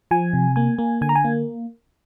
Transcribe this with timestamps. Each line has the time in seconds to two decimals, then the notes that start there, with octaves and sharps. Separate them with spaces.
0.11 F3 G#5
0.33 C3
0.56 A#3 G#5
0.78 A#3
1.01 D3 G#5
1.09 A#5
1.15 G#5
1.24 A#3